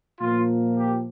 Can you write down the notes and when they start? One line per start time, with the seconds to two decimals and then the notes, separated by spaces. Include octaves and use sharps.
0.20 A#2 F3 A#3 F4
0.75 G4